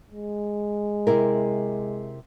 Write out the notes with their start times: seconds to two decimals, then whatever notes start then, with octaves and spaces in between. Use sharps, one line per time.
0.11 G#3
1.07 C3 E4 A#4